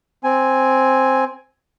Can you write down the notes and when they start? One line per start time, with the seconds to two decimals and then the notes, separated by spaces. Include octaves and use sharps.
0.24 C4 G#5